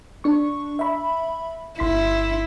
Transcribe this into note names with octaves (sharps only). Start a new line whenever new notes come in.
D4 C#6
E5 B5
G1 E4 C6 B6